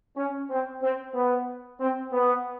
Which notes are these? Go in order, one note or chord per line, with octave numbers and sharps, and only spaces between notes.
C#4
C4
C4
B3
C4
B3